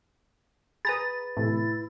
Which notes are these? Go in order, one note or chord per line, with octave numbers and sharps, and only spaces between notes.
G#4 B4 A#5 B5 D#6 A6
A2 C3 E3 E4